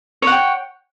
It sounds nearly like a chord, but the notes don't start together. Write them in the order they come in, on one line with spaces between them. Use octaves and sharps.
C#5 F#5 G5